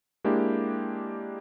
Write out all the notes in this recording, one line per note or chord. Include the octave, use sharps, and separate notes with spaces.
G#3 A#3 D4 E4 G4